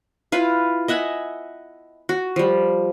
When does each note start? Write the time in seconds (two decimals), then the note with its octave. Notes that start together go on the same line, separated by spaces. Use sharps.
0.32 E4 F4 B4 F5
0.88 D#5 E5 F#5 G#5
2.09 F#4
2.36 F3 G3